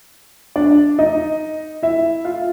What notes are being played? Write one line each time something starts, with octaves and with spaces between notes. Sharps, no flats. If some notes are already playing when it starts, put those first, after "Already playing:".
D4 D5
D#4 D#5
E4 E5
F4 F5